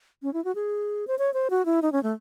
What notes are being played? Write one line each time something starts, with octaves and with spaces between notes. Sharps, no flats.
C#4
E4
F#4
G#4
C5
C#5
C5
F#4
E4
D#4
C#4
A3